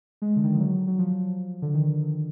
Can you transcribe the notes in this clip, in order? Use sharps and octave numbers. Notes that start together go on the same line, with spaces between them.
G#3
D3
D#3
F3
F#3
F#3
F3
D3
D#3